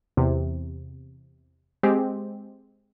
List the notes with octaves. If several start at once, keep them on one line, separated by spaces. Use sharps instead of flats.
E2 C3
G#3 C4 G4